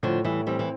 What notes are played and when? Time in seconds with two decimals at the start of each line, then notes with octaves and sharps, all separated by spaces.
0.03 A2 D3 F3
0.25 A2 E3 G3
0.47 E3 G3 C4
0.59 E3